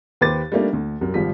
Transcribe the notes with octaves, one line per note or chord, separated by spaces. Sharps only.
D#2 G4 B4 C5 D6 A6
G3 A3 A#3 D4 D#4
D2
C2 F#2
G#1 F3 G3 B6